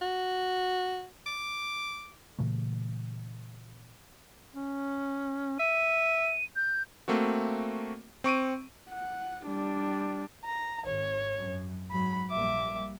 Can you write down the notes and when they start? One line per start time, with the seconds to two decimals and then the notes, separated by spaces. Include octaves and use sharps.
0.02 F#4
1.26 D6
2.39 A#2 C#3 E3 A3
4.55 C#4
5.59 E5 D#7
6.56 G6
7.08 A3 A#3 C4 F#4
8.24 C4 C#6 D7 D#7
8.89 F#5
9.44 G3 D4
10.45 A#5
10.86 G#1 C#5
11.37 F#2
11.91 G#2 F#3 B5
12.30 A#1 G3 A#3 E5 D6